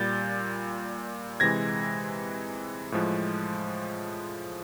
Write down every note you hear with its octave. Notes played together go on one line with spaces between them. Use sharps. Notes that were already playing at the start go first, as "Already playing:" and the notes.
Already playing: A#2 G3 G6 A6
C3 E3 G#3 G#6 A#6
A2 F3 G#3